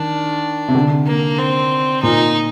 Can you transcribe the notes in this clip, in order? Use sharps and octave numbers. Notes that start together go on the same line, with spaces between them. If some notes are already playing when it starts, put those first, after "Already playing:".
Already playing: D#3 D4
C3
D3
A#3
C4
A#2 D#4